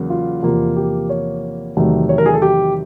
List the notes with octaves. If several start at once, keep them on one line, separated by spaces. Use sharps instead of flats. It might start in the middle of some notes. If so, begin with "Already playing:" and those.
Already playing: E2 C#3 F#3 A#3
F4
E2 C3 F3 A#3
G4
C#5
E2 C3 D#3 F#3 A3
C#5
A#4
G#4
A4
G4